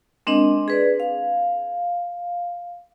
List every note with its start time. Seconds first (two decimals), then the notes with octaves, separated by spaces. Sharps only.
0.27 G#3 C4 D4 A#4 D#5
0.68 G#4 B4 D5
1.00 F5